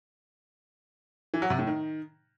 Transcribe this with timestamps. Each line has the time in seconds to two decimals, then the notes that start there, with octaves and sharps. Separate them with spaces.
1.34 E3
1.42 F#3
1.50 C3
1.59 A2
1.67 D#3